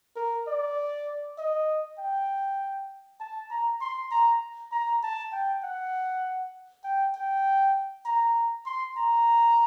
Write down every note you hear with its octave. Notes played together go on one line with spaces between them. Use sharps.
A#4
D5
D#5
G5
A5
A#5
C6
A#5
A#5
A5
G5
F#5
G5
G5
A#5
C6
A#5